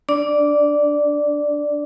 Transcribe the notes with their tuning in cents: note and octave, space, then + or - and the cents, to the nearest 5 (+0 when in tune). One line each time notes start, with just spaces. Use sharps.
D4 -15 D5 +0